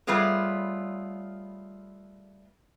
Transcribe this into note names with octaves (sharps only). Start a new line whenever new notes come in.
G3 A3 B3 F4 G#4 C#5